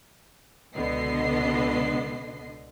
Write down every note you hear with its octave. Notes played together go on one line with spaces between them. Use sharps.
C#2 B2 D3 B3 D#5 C7